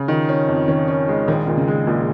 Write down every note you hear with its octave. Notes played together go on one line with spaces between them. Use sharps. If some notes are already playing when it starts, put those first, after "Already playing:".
Already playing: C#3
D#3 F3
C#4
F2
D#3 C#4
C#4
G#3
A#1 D#3
A#2 D#3
C#3
G#3
A#1 A#2